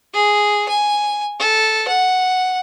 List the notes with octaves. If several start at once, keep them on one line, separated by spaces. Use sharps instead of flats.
G#4
G#5
A4
F#5